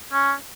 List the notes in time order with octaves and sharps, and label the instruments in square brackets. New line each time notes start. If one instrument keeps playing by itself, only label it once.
[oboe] C#4